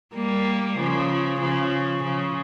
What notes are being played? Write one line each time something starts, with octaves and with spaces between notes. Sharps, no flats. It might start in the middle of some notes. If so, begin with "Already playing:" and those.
G3 A#3
C#3 F3
C#3 F3
C#3 F3